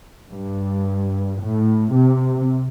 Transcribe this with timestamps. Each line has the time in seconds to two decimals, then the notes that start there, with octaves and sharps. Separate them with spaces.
0.31 G2
1.40 A2
1.93 C3